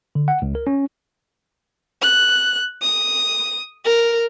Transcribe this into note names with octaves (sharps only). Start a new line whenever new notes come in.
D3
F#5
C#2
A#4
C#4
F#6
D#6
A#4